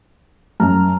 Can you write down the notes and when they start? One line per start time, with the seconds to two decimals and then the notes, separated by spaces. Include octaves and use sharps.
0.60 F#2 A5 A#5 F6